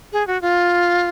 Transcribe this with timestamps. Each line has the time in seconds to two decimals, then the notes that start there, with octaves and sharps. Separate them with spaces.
0.13 G#4
0.27 F#4
0.42 F4